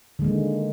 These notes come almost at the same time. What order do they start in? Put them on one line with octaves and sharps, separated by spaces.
D3 G#3 A#3 D#3